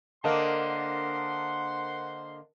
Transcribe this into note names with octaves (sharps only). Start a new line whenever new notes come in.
D3 A#3 A#4 C5 D#5 F#5 A5 C6